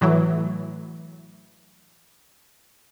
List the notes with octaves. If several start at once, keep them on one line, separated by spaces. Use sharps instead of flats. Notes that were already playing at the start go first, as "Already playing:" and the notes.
A2 E3 F#3 E4